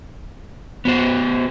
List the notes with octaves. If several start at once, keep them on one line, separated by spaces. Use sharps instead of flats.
B3 F#4 C5